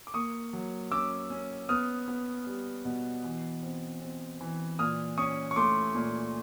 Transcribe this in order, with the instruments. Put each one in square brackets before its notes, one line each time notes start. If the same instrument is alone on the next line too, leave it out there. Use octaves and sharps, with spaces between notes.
[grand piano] D6
A#3 C#6 D#6
F#3
C#4 D6 E6
C#4
B3 D#6 F6
B3
G3
B2
E3
C4
C4
E3
A#2 D#6 F6
C#4 C#6 D#6
C#6
A3 C6 D6
A#2